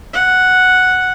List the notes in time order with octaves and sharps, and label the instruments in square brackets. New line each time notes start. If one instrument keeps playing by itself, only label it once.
[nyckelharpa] F#5